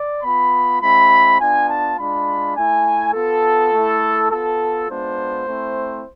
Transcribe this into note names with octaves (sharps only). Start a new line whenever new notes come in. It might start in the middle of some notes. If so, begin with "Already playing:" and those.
Already playing: D5
B3 F4 B5
G#3 C4 E4 B5
B3 D4 F4 G#5
A5
G#3 D4 F4 B5
A3 E4 G#5
B3 F4 A4
A3 E4
B3 F4 A4
G#3 B3 D4 F4 C5
A3 C4 E4